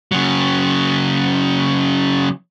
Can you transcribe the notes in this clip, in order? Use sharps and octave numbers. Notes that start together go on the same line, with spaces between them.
C#3 F#3